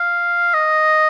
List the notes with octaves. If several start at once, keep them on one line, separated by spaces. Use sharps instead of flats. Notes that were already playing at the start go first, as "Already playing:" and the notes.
Already playing: F5
D#5